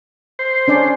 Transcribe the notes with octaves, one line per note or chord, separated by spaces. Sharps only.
C5
C#4 D4 D5